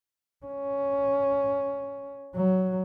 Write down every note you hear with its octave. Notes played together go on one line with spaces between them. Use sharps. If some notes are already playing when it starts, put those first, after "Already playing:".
C#4
F#3